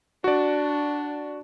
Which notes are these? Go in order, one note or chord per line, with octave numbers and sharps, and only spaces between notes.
D4 F#4 D5